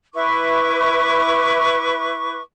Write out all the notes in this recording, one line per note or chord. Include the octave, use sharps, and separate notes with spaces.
E4 B4 C#6 D6